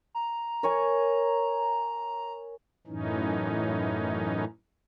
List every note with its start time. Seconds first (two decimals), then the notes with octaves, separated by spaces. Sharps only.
0.15 A#5
0.63 A#4 C#5 G#5
2.87 F#2 A2 E3 C#4 D#4